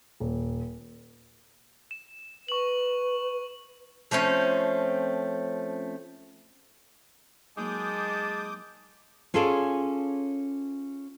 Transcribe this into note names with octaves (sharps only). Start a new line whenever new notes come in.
D#1
E7
B4 C#6 F#7
F3 A3 C4 C#4
F#3 G#3 A#3 D#4 A5 D6 D#6 G6
C#4 F4 G#4 A4 C#5 D5